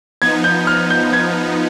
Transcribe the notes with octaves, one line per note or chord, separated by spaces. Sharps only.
F3 B3 D#4 G#6
G6
F6
G6
G#6